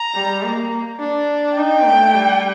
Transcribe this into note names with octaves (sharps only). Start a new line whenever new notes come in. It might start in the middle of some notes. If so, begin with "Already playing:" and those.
Already playing: A#5
G3
A#3
D4
D#4 G5
A3
G3